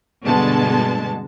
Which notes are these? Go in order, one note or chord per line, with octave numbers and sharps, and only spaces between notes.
G2 B2 D3 G#3 B3 A5